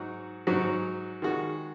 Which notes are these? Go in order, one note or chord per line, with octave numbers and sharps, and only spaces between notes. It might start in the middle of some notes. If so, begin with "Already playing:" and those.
Already playing: G#2 F#3 D#4 F#4
G#2 F#3 D#4 F#4
D#3 G#3 F#4